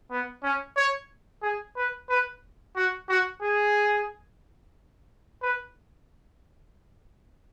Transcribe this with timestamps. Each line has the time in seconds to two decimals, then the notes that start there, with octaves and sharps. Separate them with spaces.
0.11 B3
0.43 C#4
0.77 C#5
1.43 G#4
1.77 B4
2.09 B4
2.76 F#4
3.09 F#4
3.42 G#4
5.42 B4